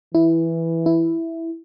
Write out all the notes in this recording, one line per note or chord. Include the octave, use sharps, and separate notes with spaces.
E3 E4
E4